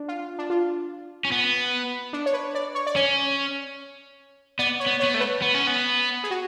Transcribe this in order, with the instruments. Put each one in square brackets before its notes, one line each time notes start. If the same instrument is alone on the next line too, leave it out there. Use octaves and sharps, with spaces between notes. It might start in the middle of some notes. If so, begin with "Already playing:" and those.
Already playing: [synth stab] D4
F4
D4
F4
[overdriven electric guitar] C#4
B3
[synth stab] D4
C#5
B4
D5
C#5
D5
[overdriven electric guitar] C#4 [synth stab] C#5
[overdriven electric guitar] B3 [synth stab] D5
[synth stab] C#5
[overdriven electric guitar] B3
[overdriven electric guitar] B3 [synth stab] C#5
[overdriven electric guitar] A3
[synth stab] B4
[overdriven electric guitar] B3
C#4
B3
[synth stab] G#4
F#4